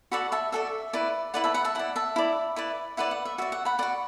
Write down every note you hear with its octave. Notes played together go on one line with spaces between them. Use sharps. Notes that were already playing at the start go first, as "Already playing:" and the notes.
F#4 A4 D5 F#5 B5
E5 A5
F#4 A4 D5 E5
E4 B4 D5
E4 B4 D5 F#5
E5 A5
F#5 B5
E5 A5
E4 D5 F#5
E5 A5
E4 D5
E4 B4 D5
E4 B4 D5 F#5
F#5
E5
F#4 D5 E5
F#5
F#5 B5
F#4 D5 F#5